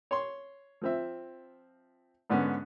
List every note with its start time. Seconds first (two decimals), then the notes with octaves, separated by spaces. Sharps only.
0.11 C#5 C6
0.81 F3 C4 E5
2.30 G#2 D3 B3 C#4